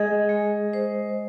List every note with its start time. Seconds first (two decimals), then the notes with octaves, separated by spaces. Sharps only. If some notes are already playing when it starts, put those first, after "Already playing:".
Already playing: G#3 G#4 D#5
0.29 G#3
0.73 C5